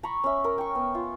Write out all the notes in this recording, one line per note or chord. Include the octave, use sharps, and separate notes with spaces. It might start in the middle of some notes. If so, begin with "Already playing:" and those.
A#5 B5 C#6
C#4 E5
A#4
G5 C#6
B3
F4